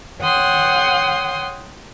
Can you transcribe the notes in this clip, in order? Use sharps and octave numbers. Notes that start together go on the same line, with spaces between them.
C#5 F#5 G5 C6 D#6